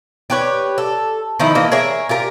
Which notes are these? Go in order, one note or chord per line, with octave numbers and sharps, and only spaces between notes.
G4 B4 C#5
A4
D#3 F3 D#4 E4
E3 A#3 D#5
G#4 A#4 C#5 E5
F4 G4 A#4